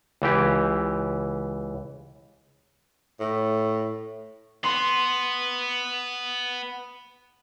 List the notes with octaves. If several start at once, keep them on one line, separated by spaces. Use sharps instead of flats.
C#2 E3 G4
A2
B3 C6